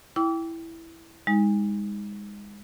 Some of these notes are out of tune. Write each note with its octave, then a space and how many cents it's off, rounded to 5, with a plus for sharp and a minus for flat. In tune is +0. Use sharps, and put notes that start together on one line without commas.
E4 +0 G5 +0 D6 -35
G#3 -25 D#4 +25